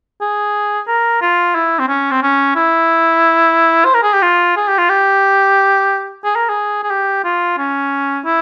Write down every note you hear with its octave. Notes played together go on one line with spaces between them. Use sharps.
G#4
A#4
F4
E4
C4
C#4
C4
C#4
E4
C5
A#4
G#4
G4
F4
G#4
G4
F4
G4
G#4
A#4
G#4
G#4
G4
F4
C#4
E4